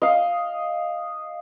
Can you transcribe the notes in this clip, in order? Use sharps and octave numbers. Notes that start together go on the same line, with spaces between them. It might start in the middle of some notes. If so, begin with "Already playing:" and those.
D#5 F5